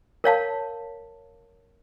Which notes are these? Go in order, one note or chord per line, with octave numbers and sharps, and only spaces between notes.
A#4 C#5 F5 A5